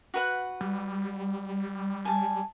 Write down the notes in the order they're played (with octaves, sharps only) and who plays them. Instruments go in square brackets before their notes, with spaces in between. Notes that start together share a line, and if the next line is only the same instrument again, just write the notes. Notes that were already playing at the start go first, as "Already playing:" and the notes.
[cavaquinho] F#4 B4 F#5
[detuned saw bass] G3
[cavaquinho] G#5 A5